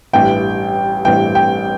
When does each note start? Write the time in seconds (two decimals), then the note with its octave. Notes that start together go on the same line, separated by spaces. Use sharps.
0.13 A1 G2 E3 G5
1.05 A1 G2 E3 G5
1.35 G5